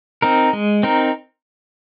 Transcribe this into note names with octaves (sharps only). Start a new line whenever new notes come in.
C4 D#4 A#4
G#3
C4 D#4 A#4